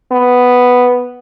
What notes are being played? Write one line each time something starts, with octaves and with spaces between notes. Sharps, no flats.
B3